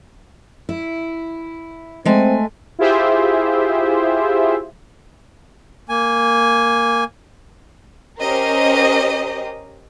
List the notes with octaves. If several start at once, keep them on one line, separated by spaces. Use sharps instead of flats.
E4
G#3 A3 C4 G#5
E4 F4 G4 G#4 C5 E5
A#3 G#5
C#4 G4 A#4 C5 D#5